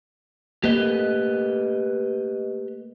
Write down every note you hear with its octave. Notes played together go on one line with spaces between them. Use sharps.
A3 A#3 G4 B4 D#5